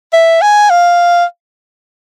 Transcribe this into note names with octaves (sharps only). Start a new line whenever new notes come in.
E5
G#5
F5